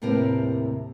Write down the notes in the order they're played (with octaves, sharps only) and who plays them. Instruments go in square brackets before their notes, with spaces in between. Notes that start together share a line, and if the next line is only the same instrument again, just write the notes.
[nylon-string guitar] D#2 A2 C3 G4 A#4 B4